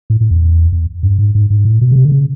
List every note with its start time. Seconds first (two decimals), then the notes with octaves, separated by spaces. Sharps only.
0.10 A2
0.21 A2
0.31 E2
0.72 E2
1.03 G2
1.18 G#2
1.35 G#2
1.50 G#2
1.65 A2
1.81 B2
1.91 C#3
1.96 C3
2.05 D3
2.12 C#3